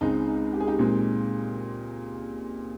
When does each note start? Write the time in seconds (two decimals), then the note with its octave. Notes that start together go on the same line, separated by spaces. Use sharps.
0.01 C#2 C#3 G#3 C4 D#4
0.27 D#4
0.53 G4
0.60 G#4
0.67 D#4 G4
0.79 A#2 G#3 C4